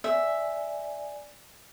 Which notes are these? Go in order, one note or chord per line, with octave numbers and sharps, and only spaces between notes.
D5 E5 G#5